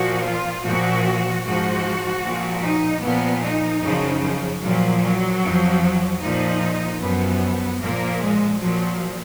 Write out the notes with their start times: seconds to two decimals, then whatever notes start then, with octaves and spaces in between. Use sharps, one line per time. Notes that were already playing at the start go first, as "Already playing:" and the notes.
Already playing: A#2 F3 F#4
0.25 F4
0.64 A#2 F3 F#4
1.43 G#2 F3 F#4
2.23 A#2 F3
2.63 D#4
3.02 A#2 F3 B3
3.42 D#4
3.82 F#2 C#3 F3
4.22 F3
4.62 A#2 F3 F#3
5.02 F#3
5.42 F2 F3
5.82 F#3
6.21 A#2 F3 D#4
7.01 F#2 F3 B3
7.81 A#2 F3 A#3
8.21 G#3
8.61 A#2 F3 F#3